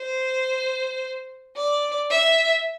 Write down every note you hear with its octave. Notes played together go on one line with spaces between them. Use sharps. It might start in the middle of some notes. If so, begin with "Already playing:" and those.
Already playing: C5
D5
E5